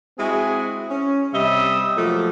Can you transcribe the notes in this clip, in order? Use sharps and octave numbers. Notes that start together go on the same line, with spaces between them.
G#3 C4 E4 F#4 G#4
C#4
C3 G3 D#5 E5
F3 F#3 A3 A#3